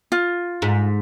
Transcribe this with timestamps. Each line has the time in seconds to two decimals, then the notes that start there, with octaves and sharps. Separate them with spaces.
0.12 F4
0.62 G#2